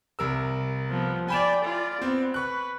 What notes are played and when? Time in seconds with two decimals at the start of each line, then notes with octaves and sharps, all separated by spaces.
0.19 C2 A#4 E6
0.90 F3 B3
1.28 D5 G5 G#5 B5 E7
1.65 F4 D5
2.02 B3 C4
2.34 B4 C#6 F#6